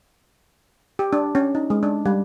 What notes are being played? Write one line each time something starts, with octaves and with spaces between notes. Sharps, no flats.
G4
D4
C#4
D#4
G#3
D4
G3